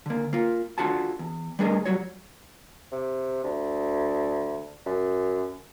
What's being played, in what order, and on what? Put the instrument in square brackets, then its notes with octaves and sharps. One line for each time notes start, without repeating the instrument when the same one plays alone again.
[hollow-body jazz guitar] D3 A#3
A#3 F4
D4 F4 F#4 A4 F#5 A5
E2
G3 A3 D4 G#4 A#4 D#5
F#3 G3 F#4 C#5
[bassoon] C3
D2
F#2